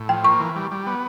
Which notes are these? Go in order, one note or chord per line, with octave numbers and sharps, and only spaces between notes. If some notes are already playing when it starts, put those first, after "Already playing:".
Already playing: A2
F3 G5
A#3 C#6
E3
G3
G3
B3